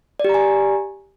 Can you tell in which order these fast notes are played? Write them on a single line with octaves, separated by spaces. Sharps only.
D5 G4 A#5 G#5